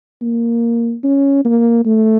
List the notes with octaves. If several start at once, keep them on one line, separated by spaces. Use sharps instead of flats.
A#3
C#4
A#3
A3